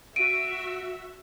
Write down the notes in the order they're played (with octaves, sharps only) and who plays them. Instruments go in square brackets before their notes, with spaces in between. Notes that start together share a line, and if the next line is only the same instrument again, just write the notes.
[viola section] F#4 E5 [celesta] D7 D#7